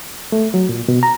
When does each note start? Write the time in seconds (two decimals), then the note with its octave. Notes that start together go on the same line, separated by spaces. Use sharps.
0.32 A3
0.54 F#3
0.69 A#2
0.88 B2
1.03 A#5